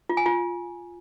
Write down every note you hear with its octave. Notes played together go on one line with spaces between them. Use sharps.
F4
G#5
F4